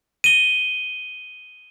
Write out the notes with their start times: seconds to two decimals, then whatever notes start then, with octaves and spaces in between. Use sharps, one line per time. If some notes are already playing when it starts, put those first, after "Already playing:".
0.24 D#7 G7